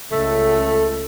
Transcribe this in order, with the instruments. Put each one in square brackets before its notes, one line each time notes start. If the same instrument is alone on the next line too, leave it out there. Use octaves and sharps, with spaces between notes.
[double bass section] C#2 [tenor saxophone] A3 [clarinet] A4